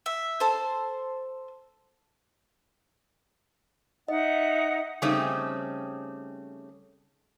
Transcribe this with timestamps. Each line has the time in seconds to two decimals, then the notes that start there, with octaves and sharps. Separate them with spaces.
0.06 E5
0.40 A4 C5
4.08 D#4 D#5 E5 F#5
5.02 C#3 G3 A3 C4 C#4 D#4